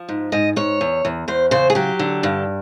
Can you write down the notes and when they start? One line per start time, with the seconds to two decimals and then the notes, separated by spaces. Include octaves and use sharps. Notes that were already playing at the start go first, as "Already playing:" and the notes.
Already playing: F3
0.09 G#2
0.32 G#2 D#5
0.56 G#2 C#5
0.81 E2
1.05 E2
1.28 E2 C5
1.51 C#3 C5
1.70 G#4
1.75 F#3 G4
1.99 D3
2.23 G2